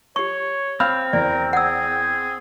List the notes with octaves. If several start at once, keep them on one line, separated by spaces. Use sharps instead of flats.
G4 C#5 C#6
C4 F5 B5 F6
E2 A#4 D5
G#4 F#5 E6